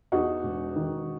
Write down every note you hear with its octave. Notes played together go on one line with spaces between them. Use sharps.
E2 D#4 F#4
E1
D#3